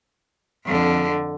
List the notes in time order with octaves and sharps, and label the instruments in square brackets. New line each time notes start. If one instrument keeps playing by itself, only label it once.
[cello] F2 D3